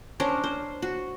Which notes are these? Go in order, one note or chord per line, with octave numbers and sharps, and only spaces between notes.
C#4 D4 A#4 C5
C5
F#4